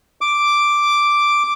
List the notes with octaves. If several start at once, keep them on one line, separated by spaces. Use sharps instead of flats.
D6